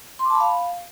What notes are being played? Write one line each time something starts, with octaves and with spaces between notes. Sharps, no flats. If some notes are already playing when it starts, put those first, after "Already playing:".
C6
D6
A5
B5
F5